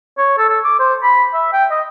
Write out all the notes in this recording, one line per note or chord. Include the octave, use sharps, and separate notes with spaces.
C#5
A4
A4
D6
C5
B5
E5
G5
D#5